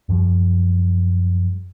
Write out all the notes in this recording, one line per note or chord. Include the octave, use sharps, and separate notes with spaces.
F#2 F3 G3